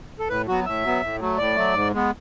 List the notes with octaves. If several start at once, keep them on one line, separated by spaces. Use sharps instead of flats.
A4
A2 B4
F#3 B3 F#4
A2 E5
F#3 B3
A2
F#3 A3
A2 D5
F#3 A3
G#2
G#3 B3